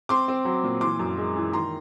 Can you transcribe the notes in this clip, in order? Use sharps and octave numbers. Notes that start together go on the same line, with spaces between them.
C4 C6 D6
C4
F#3
A#2
E3 C6 D6
F#2
G#3
E3
D#3 A#5 C6